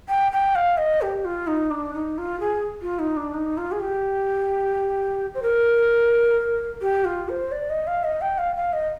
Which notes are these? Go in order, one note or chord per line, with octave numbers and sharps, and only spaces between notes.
G5
G5
F5
D#5
G4
F4
D#4
D4
D#4
F4
G#4
F4
D#4
D4
D#4
F4
G#4
G4
C5
A#4
G4
F4
C5
D5
D#5
F5
D#5
G5
F5
F5
D#5